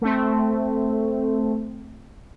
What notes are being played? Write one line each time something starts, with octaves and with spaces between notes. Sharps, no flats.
A3 C4